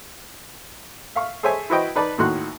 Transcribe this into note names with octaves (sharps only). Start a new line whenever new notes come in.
E5 F5 C#6
G#4 A4 C5 C#5 E5 G#5
E4 F#4 B4 C5 D#5 G5
D#4 B4 D5 A5
D#2 A2 D#3 F#4 C6 F#6